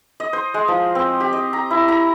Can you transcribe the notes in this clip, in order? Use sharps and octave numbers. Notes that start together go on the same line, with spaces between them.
D#5
C5
G#3
F3
C4
G4
D#5
A#5
E4
A#5